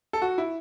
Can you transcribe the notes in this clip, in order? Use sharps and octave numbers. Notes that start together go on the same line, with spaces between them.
A4
F#4
E4